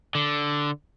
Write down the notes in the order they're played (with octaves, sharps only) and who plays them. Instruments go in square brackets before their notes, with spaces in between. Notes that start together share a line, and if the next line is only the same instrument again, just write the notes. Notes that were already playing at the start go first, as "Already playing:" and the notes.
[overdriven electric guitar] D3